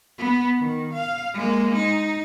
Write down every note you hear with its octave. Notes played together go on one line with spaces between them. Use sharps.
B3
D#3
F5
G#3 A#3
D#4